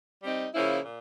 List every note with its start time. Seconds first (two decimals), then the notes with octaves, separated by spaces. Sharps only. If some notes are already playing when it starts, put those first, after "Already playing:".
0.22 G3 C4 D#4
0.54 C#3 F3 A#3 C#4 E4
0.85 A#2